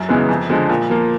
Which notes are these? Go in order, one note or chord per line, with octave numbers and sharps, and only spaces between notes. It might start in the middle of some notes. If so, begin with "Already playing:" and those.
Already playing: F#2
C#3 E3 G#3 B3
F2
D3 F3 G#3
A#2
F3 A#3